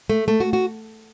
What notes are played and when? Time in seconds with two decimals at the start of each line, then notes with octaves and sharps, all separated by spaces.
0.10 A3
0.28 A3
0.40 F#4
0.53 F#4